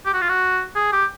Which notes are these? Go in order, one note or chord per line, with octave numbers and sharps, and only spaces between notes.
G4
F#4
F4
F#4
G#4
G4